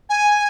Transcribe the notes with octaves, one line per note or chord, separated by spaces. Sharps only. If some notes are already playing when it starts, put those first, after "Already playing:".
G#5